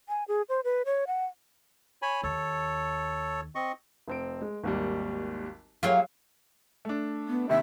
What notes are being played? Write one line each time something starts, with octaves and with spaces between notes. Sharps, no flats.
G#5
G#4
C5
B4
C#5
F#5
C#5 G#5 B5
D#2 A4 C#5
C4 D#5 C#6
F1 C4 D7
G#3
G#1 D#2 G3
F#3 A#3 F4 G4 G#4
A3 D4
B3
D#2 C3 D#3 E5